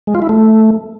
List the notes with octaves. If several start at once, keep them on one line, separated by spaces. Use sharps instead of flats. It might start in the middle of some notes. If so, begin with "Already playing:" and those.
G#3
F4
E4
A3